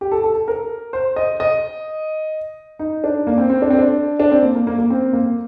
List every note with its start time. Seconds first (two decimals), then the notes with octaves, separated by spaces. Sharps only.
0.01 G4
0.12 A4
0.24 A4
0.35 A4
0.48 A#4
0.93 C5
1.16 D#5
1.40 D#5
2.79 D#4
3.04 D4
3.27 A#3
3.38 C4
3.50 C4
3.62 D4
3.70 C4
3.78 D4
4.20 D4
4.31 C4
4.43 A#3
4.55 A#3
4.67 A#3
4.79 A#3
4.90 C4
5.13 A#3